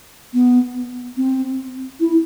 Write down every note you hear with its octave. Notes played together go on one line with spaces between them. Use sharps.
B3
C4
E4